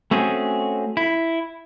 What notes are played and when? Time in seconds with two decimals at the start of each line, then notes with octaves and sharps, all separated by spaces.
0.11 A3 C4 C#4 F#4 G#4
0.97 E4